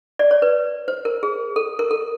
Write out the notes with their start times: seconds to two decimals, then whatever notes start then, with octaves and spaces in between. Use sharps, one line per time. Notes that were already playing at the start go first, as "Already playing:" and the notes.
0.19 D5
0.31 C#5
0.42 B4
0.88 C5
1.05 A#4
1.23 G#4
1.56 A4
1.79 A#4
1.91 A4